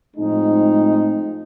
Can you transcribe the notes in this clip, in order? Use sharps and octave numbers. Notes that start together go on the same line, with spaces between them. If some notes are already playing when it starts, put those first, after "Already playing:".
A2 F3 G#3 C4 D#4